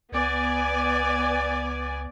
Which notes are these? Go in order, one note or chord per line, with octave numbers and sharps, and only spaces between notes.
C#2 B3 D5 G#5